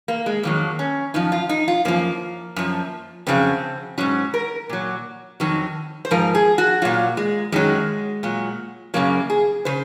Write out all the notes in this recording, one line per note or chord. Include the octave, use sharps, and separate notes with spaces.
A#3
G#3
F2 D#3 F#3 A#3
C#4
F#2 F3 D#4
F4
D#4
F4
F#2 F3 A#3
F#2 F3
F2 C#3 F#3 C4
G#2 D#3 F#3 C#4
A#4
A#2 F#3
F2 D#3 F#3
C5
G#2 F3 A#4
G#4
F#4
A#2 F#3 F4
G#3
F#2 D#3 F#3 G#3
A#2 F#3
F#2 C#3 F#3 A#3
G#4
C#3 C5